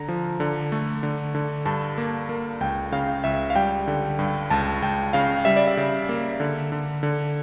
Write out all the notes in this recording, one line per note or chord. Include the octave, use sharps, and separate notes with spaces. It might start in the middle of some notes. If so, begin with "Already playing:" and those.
Already playing: D3 A#5
F3
D3
A3
D3
D3
G2 A5
A#3
A#3
C#2 G5
C#3 F5
C#2 E5
F5
G3 G5
D3
G2
C#2 A5
C#2 G5
C#3 F5
G3 E5
D5
E5
C#3
A#3
D3
D3
D3